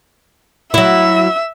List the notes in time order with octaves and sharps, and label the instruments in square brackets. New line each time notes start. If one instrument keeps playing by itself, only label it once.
[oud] F#3 E4 [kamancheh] E5 E6